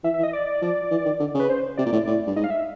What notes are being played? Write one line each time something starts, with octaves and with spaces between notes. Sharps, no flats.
E3 E5
E5
E3
D#5
D5
F3
E3
D#3
D3
C#3
B4
C5
C3 D5
A#2
A2
A2
G2
G#2 D#5
F5
E5